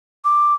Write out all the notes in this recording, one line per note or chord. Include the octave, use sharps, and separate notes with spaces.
D6